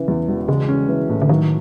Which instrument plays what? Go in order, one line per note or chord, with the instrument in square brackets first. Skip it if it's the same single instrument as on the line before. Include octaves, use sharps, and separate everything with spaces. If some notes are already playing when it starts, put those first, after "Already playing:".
Already playing: [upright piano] C#3 E3
E2
E1
[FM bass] C#3 [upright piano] G#3
[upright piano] C#4
E3
A2
[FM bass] D3
[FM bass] D#3 [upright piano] F#3